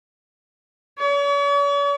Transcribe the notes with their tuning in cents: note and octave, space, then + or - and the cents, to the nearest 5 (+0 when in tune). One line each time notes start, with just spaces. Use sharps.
C#5 +45